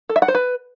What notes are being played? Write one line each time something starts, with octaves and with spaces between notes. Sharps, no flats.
A4
E5
F#5
C5
B4